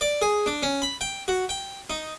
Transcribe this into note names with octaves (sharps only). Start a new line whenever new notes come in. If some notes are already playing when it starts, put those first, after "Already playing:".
D5
G#4
D4
C#4
B5
G5
F#4
G5
D#4